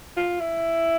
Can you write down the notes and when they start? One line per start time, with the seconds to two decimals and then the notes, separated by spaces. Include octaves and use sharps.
0.17 F4
0.40 E4